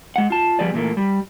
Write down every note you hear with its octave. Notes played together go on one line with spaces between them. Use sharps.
G#3 F#5
F4 A5
F3 G3 B3 G#4 D5
A#2 E3 A3 A#3
G3